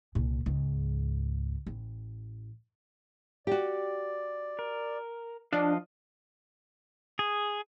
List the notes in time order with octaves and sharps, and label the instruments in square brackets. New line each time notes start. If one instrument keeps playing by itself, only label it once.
[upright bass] C2 A#2
C#2 G#2
A1
[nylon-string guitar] F#4 G4 [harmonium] D5
[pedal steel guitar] A#4
[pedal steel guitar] F3 D#5 F5 [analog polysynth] D4
[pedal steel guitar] G#4